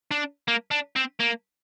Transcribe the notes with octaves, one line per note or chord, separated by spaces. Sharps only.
D4
A#3
D4
C4
A#3